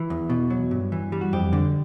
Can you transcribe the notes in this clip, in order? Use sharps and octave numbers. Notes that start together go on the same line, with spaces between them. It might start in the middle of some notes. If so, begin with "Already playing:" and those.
Already playing: E3
E2
B2
F#3
G2
E3
G3
F#4
F2 G4
D3